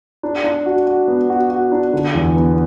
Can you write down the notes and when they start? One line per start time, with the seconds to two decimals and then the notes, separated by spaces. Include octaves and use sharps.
0.23 D4
0.44 D4
0.66 F#4
0.87 F#4
1.08 B3
1.30 F#4
1.50 F#4
1.72 D4
1.93 D3
2.15 E2
2.36 B3